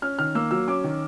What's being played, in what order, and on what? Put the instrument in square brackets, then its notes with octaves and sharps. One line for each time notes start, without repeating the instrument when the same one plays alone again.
[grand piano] C#4 F6
D#3 F6
A#3 E6
F#3 E6
C#4 D6
D#3